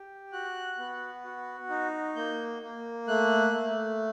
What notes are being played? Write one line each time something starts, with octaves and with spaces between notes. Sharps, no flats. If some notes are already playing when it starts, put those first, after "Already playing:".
Already playing: G4
F#4 F#6
B3
F#4
D#4
A#3 G6
A#3
A3 F#6
A3